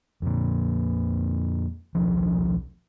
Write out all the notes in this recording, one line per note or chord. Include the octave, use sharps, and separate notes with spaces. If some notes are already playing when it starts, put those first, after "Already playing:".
F2 A#2
D#1 B1 F3